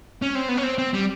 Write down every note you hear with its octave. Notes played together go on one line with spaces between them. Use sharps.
C#4
C4
B3
C#4
C4
C4
G3